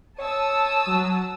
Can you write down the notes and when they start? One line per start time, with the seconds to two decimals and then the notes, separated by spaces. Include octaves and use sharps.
0.19 C#5 A5 D#6 E6
0.86 F#3